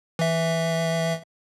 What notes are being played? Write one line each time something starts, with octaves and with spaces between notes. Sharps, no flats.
E3 E5